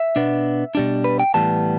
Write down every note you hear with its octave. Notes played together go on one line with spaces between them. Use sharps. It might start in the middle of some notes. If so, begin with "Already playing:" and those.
Already playing: E5
B2 B3 D4
B2 G3 D4
B4
G5
A2 E3 G3 B3 A5